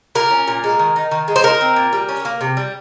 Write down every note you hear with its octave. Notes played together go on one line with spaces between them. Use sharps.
A#2 A#4
C#4
A#2
G#3
D#3
D#4
D#3
G#3
C5
D#4 A#4
C4
A#2
G3
C#4
A#3
C3
G3